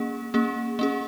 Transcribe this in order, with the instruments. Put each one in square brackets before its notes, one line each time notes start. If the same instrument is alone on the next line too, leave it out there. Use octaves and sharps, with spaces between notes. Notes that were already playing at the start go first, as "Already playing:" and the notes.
Already playing: [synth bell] A#3 C#4 G#4
A#3 C#4 G#4
A#3 C#4 G#4